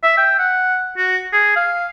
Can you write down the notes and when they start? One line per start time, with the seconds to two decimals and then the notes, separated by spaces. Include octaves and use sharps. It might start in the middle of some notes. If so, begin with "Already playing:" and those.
0.03 E5
0.18 G5
0.39 F#5
0.97 F#4
1.33 G#4
1.56 F5